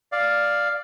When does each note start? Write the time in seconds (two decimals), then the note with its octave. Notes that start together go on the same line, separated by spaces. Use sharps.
0.12 D5 F5